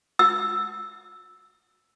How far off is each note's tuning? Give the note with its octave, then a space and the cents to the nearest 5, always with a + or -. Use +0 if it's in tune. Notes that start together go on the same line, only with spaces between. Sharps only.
E6 -5